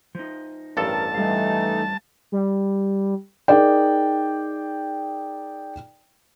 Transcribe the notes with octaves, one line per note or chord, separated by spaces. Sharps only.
F3 D#4
A1 G2 A4 A#4 A5
E3 G3 A3 D#4 F5
G3
D#4 G#4 A#4 D5 G5